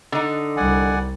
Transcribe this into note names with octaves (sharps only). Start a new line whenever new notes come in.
D3 D#4
C2 G3 D5 F#5 G#5